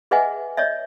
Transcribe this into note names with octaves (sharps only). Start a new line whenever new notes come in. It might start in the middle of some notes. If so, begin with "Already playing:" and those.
G#4 B4 D#5 E5 F#5 G#5
C#5 D#5 E5